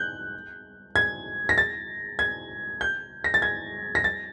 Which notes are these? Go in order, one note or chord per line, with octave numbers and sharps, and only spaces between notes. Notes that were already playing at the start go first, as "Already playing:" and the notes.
Already playing: F#6 G6
G#6
A#6
A6
G#6
G6
A#6
A6
G#6
A#6
A6